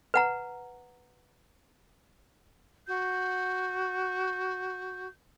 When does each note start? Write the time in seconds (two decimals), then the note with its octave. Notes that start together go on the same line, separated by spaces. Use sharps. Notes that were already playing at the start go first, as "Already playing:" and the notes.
0.14 B4 F#5 A#5
2.87 F#4 G6